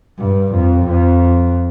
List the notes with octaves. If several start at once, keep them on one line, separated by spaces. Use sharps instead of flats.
G2
F2
F2